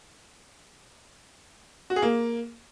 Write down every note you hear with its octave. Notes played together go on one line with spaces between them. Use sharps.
F#4
G#4
A#3